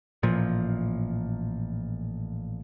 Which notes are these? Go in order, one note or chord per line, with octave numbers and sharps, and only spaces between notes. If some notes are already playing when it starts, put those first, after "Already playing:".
A1 A#2 F3